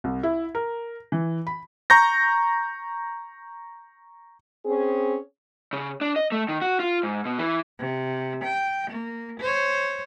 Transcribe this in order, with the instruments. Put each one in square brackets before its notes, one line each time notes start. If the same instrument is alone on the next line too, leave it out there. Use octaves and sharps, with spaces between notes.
[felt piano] C2
E4
A#4
E3
B5
[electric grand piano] A#5 C#6 G6 A#6
[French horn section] C4 C#4 G#4
[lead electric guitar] C#3
D4
D#5
A3
D#3
F#4
F4
G#2
B2
E3
[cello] C3
G5
A#3
C5 C#5